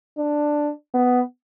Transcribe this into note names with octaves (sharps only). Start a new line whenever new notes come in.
D4
B3